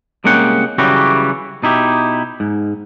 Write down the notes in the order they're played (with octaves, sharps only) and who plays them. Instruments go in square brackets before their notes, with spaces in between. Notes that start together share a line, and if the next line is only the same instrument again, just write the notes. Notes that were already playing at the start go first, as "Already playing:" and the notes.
[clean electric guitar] C2 G#3 A#3 C#4 F#5 G5
C#3 E3 F#3 G3 F#4 G4
B2 D#4 E4 G4
G#2